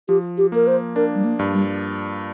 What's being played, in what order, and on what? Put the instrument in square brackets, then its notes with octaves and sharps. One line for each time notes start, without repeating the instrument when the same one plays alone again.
[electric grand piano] F3 [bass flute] G4
[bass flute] G4
[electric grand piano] A#3 [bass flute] A#4
[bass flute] C5
[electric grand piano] D4 [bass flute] A#4
[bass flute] G3
A#3
[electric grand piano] G2
[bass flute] G3